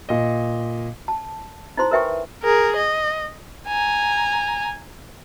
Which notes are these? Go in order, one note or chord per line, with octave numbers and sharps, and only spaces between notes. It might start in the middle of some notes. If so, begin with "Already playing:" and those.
A#2 D#5
A5
D#4 E4 C5 C6
A#4 B4 E5 G5 G#5 C#6
G#4 A#4
D#5
G#5 A#5